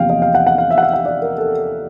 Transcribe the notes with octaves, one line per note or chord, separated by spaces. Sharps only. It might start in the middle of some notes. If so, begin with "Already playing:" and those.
Already playing: E2 C3 F3 A#3 F5 G5
D#5
F5
F#5
F#5
F5
E5
F#5
F5
F#5
D5
A#4
A4